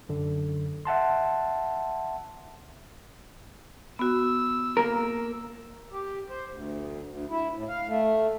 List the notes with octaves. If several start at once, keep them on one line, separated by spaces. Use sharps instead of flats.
F#2 D3
E5 F#5 A5 C6
B3 F#4 E6
A#3 A#4
G4
C5
D2
D2
E4
A2
F5
A3